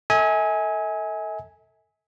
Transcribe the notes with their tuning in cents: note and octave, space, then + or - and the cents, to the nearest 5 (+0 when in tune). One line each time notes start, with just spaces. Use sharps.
A4 +20 E5 -45 G#5 +0